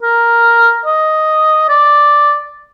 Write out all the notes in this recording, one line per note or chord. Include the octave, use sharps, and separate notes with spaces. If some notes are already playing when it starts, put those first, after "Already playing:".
A#4
D#5
D5